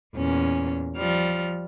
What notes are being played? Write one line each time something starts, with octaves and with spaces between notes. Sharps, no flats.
E2 A#2 C#4
F3 G3 F6